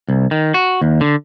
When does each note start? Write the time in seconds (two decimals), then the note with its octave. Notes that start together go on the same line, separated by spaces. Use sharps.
0.08 C2
0.31 D#3
0.54 F#4
0.82 D#2
1.01 D3